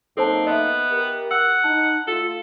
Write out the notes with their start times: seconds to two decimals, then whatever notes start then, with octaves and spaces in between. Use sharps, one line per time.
0.17 F#2 A#3 C4 D#4 A4 C5 A5
0.47 B3 D#5 E5
0.90 G4 A#4
1.31 F#5 E6
1.64 D#4 A5
2.08 A3 F4 A4